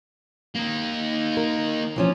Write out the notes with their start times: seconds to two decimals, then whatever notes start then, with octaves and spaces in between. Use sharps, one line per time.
0.55 A#3 D#4
1.37 A#4
1.96 E3 F3 C#4